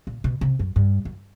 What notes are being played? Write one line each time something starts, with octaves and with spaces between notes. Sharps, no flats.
A#2
B2
C3
F#2
G2
F#2